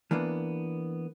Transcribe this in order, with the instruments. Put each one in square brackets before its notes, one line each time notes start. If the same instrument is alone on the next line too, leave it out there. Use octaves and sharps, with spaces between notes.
[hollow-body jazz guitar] E3 A#3 B3 D4